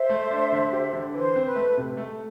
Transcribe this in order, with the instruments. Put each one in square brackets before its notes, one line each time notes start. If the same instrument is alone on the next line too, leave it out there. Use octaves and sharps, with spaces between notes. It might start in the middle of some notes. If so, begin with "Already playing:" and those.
Already playing: [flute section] C5 E5
[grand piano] A3
D4
D3
G4
D3
[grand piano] E3 [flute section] C5
[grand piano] C4
[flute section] B4
[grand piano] A3
C3
A3